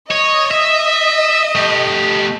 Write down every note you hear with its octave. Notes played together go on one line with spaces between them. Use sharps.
C#5 D#5
E5
A3 G4